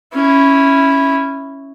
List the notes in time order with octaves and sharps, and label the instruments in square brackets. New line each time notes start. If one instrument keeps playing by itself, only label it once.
[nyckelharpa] C#4 E4